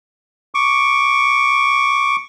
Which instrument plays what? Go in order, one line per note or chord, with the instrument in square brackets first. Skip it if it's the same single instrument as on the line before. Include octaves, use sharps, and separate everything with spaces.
[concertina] C#6 D6